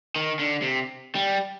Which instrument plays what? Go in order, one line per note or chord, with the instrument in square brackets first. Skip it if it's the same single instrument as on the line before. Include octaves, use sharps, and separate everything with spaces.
[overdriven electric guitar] D#3
D3
C3
G3